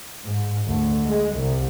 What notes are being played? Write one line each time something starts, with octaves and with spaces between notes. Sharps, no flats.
G#2
D2
G#3
C2